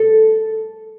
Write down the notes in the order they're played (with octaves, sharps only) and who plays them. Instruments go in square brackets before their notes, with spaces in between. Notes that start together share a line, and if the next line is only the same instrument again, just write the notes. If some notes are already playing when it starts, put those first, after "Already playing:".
Already playing: [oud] A4